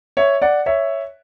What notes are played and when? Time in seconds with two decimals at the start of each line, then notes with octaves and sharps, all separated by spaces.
0.17 C#5 E5
0.42 D5 F#5
0.66 C#5 E5